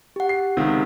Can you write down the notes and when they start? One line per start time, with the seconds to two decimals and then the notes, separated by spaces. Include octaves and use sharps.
0.16 G4 F#5
0.29 C7
0.57 C#2 C3 D#3